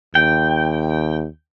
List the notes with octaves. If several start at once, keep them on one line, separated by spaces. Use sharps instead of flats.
D#2 G5